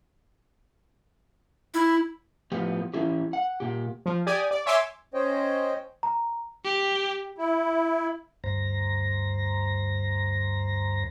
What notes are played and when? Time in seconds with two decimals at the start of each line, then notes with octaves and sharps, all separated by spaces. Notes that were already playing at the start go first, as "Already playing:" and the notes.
1.74 E4
2.52 A2 F3 B3 G4
2.94 E3 C#4 E4 G4
3.33 F#5
3.60 A#2 G4
4.06 F3
4.27 G4 D5 G#5 D#6
4.51 D5
4.66 C#5 E5 G#5 C6 D6 E6
5.14 C#4 C5 C#5 D#5 G5
6.03 A#5
6.64 G4
7.37 E4
8.44 D2 G2 C5 A#5 A#6